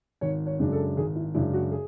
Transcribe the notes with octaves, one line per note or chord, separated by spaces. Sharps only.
G#1 C#5
C#5
F#2 C#3 G#3 D4
A4
G#1 G#4
E4
F#2 C#3 G#3 D4 E4
F#4
G#4